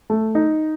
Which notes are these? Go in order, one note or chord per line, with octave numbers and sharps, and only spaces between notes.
A3
D#4